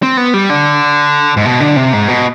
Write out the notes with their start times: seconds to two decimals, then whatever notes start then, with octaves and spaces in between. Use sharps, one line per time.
0.03 C4
0.17 B3
0.34 G3
0.50 D3
1.37 G#2
1.45 B2
1.60 D3
1.76 C3
1.93 G#2
2.08 B2